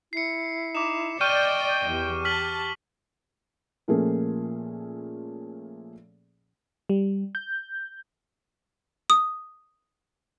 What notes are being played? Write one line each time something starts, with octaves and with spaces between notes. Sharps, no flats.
E4 C7 C#7
D#4 D6 E7
D5 D#5 G5 C#6 F6 G6 D#7
E2 G4
A5 F6 B6 F#7
A#2 F3 A3 A#3 C#4 G#4
G3
G6
D#6